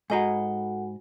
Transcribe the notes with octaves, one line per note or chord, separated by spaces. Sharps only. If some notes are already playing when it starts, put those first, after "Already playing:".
G#2 F#4 A4 D#5 F#5 G#5 A#5